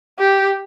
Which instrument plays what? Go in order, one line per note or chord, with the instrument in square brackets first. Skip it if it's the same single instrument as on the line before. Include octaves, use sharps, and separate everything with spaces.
[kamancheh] G4